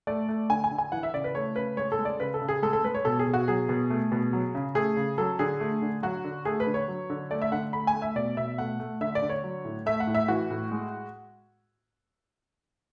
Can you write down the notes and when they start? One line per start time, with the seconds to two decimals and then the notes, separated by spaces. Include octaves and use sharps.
0.07 A3 D5
0.29 A3
0.50 D3 G#5
0.64 G#5
0.71 D3
0.78 G#5
0.92 E3 F#5
1.03 E5
1.14 C#3 D5
1.24 B4
1.35 A3 C#5
1.56 C#3 B4
1.77 G#3 C#5
1.92 A4
1.99 G#3
2.05 D5
2.20 C#3 B4
2.34 A4
2.41 C#3
2.48 G#4
2.63 G#3 A4
2.73 A4
2.84 G#3 B4
2.95 C#5
3.05 B2 A4
3.19 G#4
3.26 B2
3.34 F#4
3.48 F#3 G#4
3.69 B2
3.90 A3
4.12 B2
4.33 F#3
4.55 C#3
4.75 A3 G#4
4.97 C#3
5.18 F#3 A4
5.39 D3 G#4
5.60 A3
5.82 D3
6.03 F#3 F#4
6.24 D3
6.45 A3 G#4
6.60 B4
6.67 D3
6.74 C#5
6.88 F#3
7.10 D3
7.31 A3 D5
7.42 E5
7.52 D3 F#5
7.73 A3 B5
7.87 G#5
7.94 A3
8.02 E5
8.16 B2 D5
8.37 B2 E5
8.58 A3 F#5
8.79 A3
9.01 D3 E5
9.15 D5
9.22 D3
9.29 C#5
9.44 F#3
9.65 A2
9.86 A3 E5
10.00 F#5
10.07 A2
10.15 E5
10.28 E3 F#4
10.50 A2
10.71 G#3